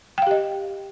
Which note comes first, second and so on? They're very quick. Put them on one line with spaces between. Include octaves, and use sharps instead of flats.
G5 F5 G4 D#5